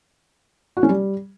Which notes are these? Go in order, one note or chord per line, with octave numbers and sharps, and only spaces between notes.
F#4
C#4
G3